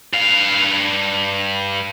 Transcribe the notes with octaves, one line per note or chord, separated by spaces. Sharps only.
G2 F5